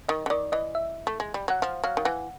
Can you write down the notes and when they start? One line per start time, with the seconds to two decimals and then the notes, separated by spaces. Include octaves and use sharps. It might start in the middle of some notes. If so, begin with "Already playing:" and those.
0.09 D#3 D#5
0.26 D3
0.30 D#3 D5
0.52 E3 D#5
0.75 E5
1.07 A3
1.20 G#3
1.34 G3
1.48 F#3 F#5
1.62 F3 F5
1.84 F#3 F5
1.97 D#3
2.05 E3 F#5